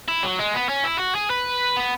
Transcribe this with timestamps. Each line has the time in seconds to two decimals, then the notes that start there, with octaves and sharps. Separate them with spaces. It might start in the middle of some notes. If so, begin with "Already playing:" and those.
0.08 E4
0.23 F#3
0.39 G#3
0.54 B3
0.69 C#4
0.85 E4
0.99 F#4
1.15 G#4
1.30 B4
1.77 B3